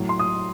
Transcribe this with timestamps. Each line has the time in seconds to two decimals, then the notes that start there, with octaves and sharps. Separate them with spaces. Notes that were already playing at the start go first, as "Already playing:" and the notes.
Already playing: A2 F#3
0.09 C6
0.19 D#6